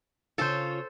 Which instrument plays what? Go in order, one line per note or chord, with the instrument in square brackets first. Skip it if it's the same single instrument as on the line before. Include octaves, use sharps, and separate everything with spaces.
[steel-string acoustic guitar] C#3 F4 C#5 [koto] A4 C5